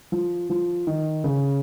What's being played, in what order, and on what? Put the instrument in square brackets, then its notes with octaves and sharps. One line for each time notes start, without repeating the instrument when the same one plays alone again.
[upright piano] F3
F3
D#3
C#3